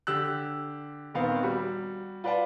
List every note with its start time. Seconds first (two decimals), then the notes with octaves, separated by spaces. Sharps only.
0.07 D3 G4 E6 F#6
1.14 D#1 D#3 B3 C4 F5
1.43 G3 F#4
2.24 F4 B4 D5 F#5 A5